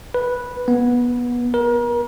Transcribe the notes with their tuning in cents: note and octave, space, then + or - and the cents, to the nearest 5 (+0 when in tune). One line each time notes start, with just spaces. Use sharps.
B4 -10
B3 -20
A#4 +35